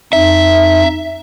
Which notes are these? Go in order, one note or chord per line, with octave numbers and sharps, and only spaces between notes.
F2 D#4 E5